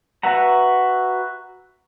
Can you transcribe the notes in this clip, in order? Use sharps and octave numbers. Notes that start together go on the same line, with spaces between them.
F#4 B4 E5 F#5 A#5